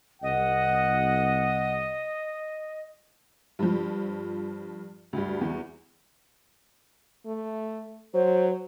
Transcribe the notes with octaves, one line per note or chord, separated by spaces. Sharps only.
C2 D#5 F#5
G2 F3
D2 G2
E2
A3
F#3 C5